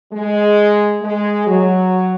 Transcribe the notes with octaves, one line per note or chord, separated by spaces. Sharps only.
G#3
G#3
F#3